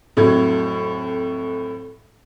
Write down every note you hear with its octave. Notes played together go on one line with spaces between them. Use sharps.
F2 A2 F#3 G#6